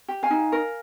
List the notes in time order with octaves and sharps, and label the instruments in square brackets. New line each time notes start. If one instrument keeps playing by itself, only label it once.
[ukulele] G4
F5 G#5
D#4
A#4